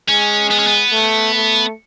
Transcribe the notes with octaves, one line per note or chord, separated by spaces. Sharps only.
G#3 C#4
B3
C#4
B3
A3
A3